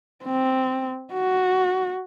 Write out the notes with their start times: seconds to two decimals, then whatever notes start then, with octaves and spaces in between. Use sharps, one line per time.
0.24 C4
1.12 F#4